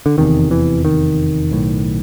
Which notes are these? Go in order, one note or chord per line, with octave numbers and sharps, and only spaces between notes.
D3
F1 E2 C3 D#3
E3
D#3
B1 A2